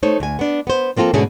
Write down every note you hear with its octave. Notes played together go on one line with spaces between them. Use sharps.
A3 D#4 C5 C#5
D2 G#5
B3 D4
B3 C5
F3 A#3 C4 F4 A4
G#2 B2 D3 A3 C#4 G#4